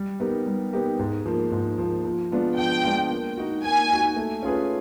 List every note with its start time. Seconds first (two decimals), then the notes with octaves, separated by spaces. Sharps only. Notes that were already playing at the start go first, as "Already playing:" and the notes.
Already playing: G3
0.20 B3 D#4 G4 A#4
0.46 G3
0.73 B3 D#4 G4 A#4
0.99 G#2
1.26 F3 A#3
1.52 G#2
1.78 F3 A#3
2.05 F3
2.31 G#3 B3 D4 F4
2.58 F3 G5
2.85 G#3 B3 D4 F4
3.10 A#3
3.37 D#4 F#4
3.63 A#3 G#5
3.90 D#4 F#4
4.16 A3
4.43 C#4 F4 G#4 B4